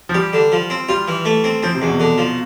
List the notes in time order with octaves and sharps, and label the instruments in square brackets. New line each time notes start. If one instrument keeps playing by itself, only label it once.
[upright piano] F3
[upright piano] G3 [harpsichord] G4
[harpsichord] D3
F3
C4
[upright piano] G3 [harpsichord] F4
[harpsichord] E3
A3
C4
[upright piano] F3 [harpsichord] C4
[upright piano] C3
[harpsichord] E2
[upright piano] B2
[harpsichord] D3
F3